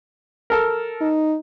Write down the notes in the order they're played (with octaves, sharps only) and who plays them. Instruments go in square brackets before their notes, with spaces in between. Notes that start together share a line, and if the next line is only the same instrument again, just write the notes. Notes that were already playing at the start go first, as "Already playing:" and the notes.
[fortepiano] A4 A#4
[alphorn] D#4